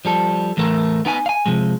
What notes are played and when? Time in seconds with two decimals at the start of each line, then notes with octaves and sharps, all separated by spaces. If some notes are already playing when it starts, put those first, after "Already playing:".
0.05 F3 G3 A4
0.57 A2 E3 A3 A4 A#4
1.05 B3 D#4 G5 G#5
1.26 F5 G#5
1.46 C3 F3 G#3